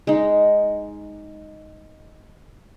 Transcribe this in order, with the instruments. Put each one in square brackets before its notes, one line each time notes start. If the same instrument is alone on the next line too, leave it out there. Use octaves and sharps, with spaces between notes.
[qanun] G#3 D#4